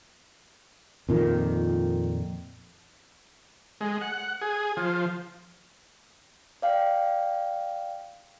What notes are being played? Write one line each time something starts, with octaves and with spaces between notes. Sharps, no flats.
F2 A#2 D#3
G#3
F#5
G#4
F3
D5 F5 G5